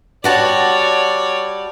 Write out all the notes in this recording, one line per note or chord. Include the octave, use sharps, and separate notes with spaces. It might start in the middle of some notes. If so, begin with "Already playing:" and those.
G3 F#4 C#5 D5 A5